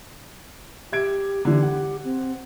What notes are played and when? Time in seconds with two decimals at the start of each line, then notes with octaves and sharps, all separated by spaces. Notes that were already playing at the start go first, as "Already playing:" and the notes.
0.92 G4 E5 G#6 D7
1.45 D3 E3 G4
1.63 F#5
2.04 C4